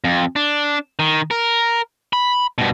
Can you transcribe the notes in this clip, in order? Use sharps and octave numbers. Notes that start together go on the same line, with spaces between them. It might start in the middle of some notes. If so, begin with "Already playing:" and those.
F2
D4
D#3
A#4
B5
G2 B2